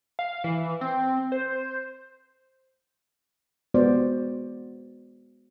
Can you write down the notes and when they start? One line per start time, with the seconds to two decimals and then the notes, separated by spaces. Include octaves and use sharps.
0.19 F5
0.44 E3
0.81 C4
1.32 C5
3.74 G#3 B3 F#4 C5 D5